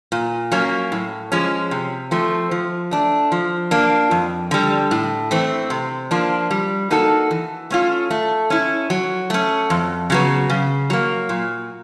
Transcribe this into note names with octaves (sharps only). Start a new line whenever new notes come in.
A#2
F#3 A#3 C#4
A2
F3 G#3 C#4
C3
F3 A3 C4
F3
A3 D4
F3
A#3 D4
F2
D3 G3
A2
E3 A3 C4
C3
F3 A#3 D4
G3
A#3 D#4 F#4 A4
E3
A3 C#4 F4
A3
C#4 E4
F#3
A3 C#4
F2
C#3 F#3 B3
C#3
F#3 A#3
A#2